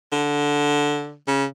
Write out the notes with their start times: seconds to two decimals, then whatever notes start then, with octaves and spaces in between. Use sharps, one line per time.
0.13 D3
1.28 C#3